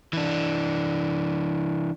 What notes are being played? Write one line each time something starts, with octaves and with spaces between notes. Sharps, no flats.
E3 D4